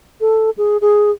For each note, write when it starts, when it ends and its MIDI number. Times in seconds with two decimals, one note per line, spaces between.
0.21 0.50 69
0.58 0.77 68
0.81 1.11 68